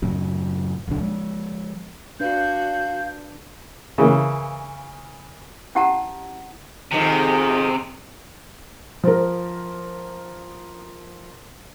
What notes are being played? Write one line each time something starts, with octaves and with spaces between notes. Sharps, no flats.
F#2 A2 C#3 F#3
D1 B1 D3 D4
F3 G#3
D4 F#4 B4 F5 G6
C#3 E3 A#3
C#4 E4 G4 F#5 A5 A#5
F2 G#2 C3 D#3
F3 A#4